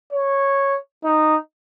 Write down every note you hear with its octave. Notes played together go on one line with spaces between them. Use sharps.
C#5
D#4